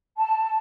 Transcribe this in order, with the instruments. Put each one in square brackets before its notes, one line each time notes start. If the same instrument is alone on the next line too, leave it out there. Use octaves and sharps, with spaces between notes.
[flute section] A5